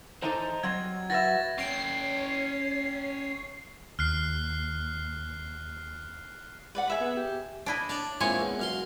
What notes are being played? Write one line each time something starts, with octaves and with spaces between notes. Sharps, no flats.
E3 D#4 A4 C5 D#5 A#5
F#3 G3 C4 D#5 G#6
F#4 B4 E5 A6 A#6
C#4 C#5 G5 C7
D#2 F6 F#6 C7
B4 D5 F#5
G#4 E5 B5
B3
G4
D4 E4 D#5
D4 C#5 D5 A5
A#2 G#3 C4 E4 C#5 G#5
E2
F#2 F5 C6